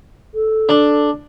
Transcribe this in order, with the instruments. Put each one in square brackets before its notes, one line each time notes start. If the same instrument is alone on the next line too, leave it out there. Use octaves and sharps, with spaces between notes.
[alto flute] A4
[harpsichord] D4